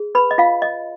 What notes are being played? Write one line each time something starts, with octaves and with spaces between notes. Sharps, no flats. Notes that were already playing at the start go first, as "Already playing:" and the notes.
Already playing: G#4
B4 B5
D#5
F4 F5
D#5